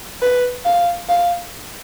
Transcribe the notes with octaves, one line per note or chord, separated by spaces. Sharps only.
B4
F5
F5